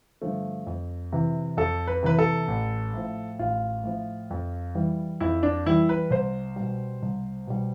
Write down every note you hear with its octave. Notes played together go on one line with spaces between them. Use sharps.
G2 D3 F3 A3
F2
C3 E3
F2 A4
B4
C3 E3 B4
A4
A1
A2 F3
A1 F4
A2 F3
F2
E3 G3
F2 E4
D4
E3 G3 E4
B4
C2 C5
B2 G3
C2
B2 G3